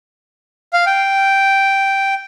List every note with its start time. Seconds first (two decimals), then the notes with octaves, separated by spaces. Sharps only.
0.73 F5
0.86 G5